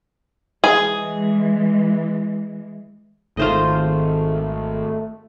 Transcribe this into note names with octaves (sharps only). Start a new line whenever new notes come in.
E3 G#3 G#4
G#1 D#3 A3 F4 C5 D#5